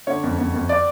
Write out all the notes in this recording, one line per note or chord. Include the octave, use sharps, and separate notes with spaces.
D3 C#5
F2
F2
F2
D5